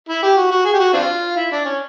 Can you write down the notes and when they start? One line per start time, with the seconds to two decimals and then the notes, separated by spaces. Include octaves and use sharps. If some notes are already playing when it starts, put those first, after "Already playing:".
0.09 E4
0.23 G4
0.37 F#4
0.51 F#4
0.65 G#4
0.74 G4
0.79 F#4
0.93 C4 D4 F4
1.36 E4
1.52 D4
1.65 C#4